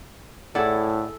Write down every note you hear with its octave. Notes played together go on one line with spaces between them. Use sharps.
A2 E4 G#4 A4 D5 F#5